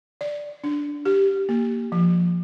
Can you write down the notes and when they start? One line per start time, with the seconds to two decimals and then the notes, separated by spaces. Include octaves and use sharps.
0.21 D5
0.64 D4
1.05 G4
1.49 A#3
1.92 F3